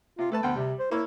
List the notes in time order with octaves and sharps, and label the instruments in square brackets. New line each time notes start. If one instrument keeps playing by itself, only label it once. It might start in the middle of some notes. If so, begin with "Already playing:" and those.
[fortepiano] C3 [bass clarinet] F4
[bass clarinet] A3 [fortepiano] A4 B4 A5
[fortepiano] D2 G5 [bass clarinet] B3
[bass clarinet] C3 [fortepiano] G3
[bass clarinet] C5
[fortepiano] A#3 C#5 E6 [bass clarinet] E4